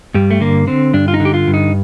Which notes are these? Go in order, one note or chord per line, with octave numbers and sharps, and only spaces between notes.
G2 G3
A3
D3 A#3
D3 C4
G2 D4
F4
D#4
D3
G4
F4
G2
D#4